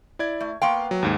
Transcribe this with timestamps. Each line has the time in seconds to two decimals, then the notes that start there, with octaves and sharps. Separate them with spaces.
0.19 E4 D5 G#6
0.41 A3
0.62 A#3 B3 F5 G5 C6 C#6
0.91 F#3
1.03 D#2 G#2